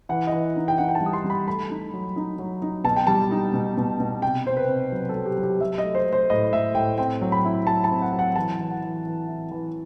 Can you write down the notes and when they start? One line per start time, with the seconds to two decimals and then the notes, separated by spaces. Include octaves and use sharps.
0.09 E3 F#5
0.27 D#5
0.32 E3
0.56 D#4
0.68 G5
0.78 D#4 F#5
0.89 G5
0.95 A5
1.01 G3
1.06 D#6
1.13 C6
1.24 G3
1.30 B5
1.47 A3 B5
1.70 D#4
1.94 F#3
2.16 D#4
2.39 F#3
2.62 D#4
2.84 B2 A5
2.96 G5
3.07 G3 A5
3.31 D#4
3.54 B2
3.77 B2
4.00 B2
4.22 C3 G5
4.45 C3 C5
4.57 B4
4.68 C3
4.92 F#3
5.09 A4
5.15 F#3
5.26 G4
5.38 F#3
5.43 G4
5.60 F#3 E5
5.78 D#5
5.84 A3
5.95 C5
6.07 A3
6.13 C5
6.30 A2 D#5
6.52 A2 E5
6.75 A2 G5
6.98 C4 G5
7.21 F#3
7.32 B5
7.45 E4
7.67 F#3 A5
7.84 A5
7.90 C4
8.02 F#5
8.13 F#3
8.19 F#5
8.36 E3 A5
8.59 E3
8.71 F#5
8.82 E3
9.05 E3
9.28 E4
9.51 E3